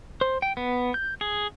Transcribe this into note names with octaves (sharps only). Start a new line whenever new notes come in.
C5
G5
B3
G6
G#4